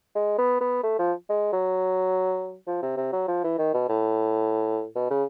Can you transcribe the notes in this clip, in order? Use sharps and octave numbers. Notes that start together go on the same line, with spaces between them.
G#3
B3
B3
A3
F3
G#3
F#3
F3
C3
C3
F#3
F3
E3
D#3
B2
A2
B2
C#3